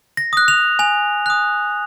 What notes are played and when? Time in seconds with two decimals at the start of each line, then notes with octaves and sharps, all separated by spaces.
0.17 A#6
0.33 D#6 F#6
0.48 F7
0.79 G#5 F7
1.26 D#6 F#6